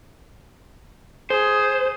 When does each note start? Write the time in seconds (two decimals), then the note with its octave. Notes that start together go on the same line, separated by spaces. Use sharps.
1.30 G#4 C5